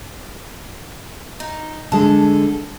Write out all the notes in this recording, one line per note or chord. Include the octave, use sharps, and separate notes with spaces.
D#4
D3 G#3 A4